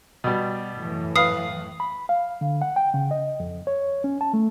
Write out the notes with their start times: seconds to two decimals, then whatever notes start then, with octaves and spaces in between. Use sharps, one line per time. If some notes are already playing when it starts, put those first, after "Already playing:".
0.24 B2 G3
0.77 F#2 A2 E3
1.16 B4 F5 D#6 C7
1.80 B5
2.09 F5
2.41 D3
2.62 F#5
2.76 G5
2.94 C#3
3.11 D#5
3.40 F2
3.67 C#5
4.04 C#4
4.21 A5
4.34 A3